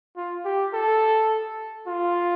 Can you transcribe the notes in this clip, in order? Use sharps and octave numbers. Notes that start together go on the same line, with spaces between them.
F4
G4
A4
F4